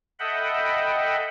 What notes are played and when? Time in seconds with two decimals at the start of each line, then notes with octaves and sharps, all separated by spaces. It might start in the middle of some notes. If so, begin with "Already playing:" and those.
0.19 A4 D#5 E5 F#5 G5 B5